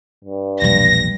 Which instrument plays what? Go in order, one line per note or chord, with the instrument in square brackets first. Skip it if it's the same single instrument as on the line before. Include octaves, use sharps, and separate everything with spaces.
[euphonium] G2
[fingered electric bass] E1 A#1 G3 [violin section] A#6